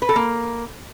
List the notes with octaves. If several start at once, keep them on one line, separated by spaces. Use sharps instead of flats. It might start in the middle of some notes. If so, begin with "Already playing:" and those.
B4
A4
A#3